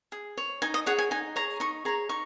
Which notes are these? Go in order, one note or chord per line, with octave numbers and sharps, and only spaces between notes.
G#4
C#5
D#4 G#5
D#5
G#4 C#5 F#5
G#5
D#4 G#5
G#4 C#5 A#5
D#4 C#6
G#4 C#5 A#5
D#4 C#6